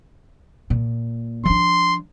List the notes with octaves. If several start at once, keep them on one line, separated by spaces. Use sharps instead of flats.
A#2
F3 D4 C6